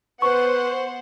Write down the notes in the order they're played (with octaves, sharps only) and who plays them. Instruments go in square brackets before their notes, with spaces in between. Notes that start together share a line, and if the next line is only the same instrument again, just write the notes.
[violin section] B3 C5 F#5 [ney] B4 [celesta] C#6